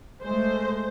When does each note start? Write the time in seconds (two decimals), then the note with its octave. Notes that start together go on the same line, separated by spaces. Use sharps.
0.23 G#3 A3 C5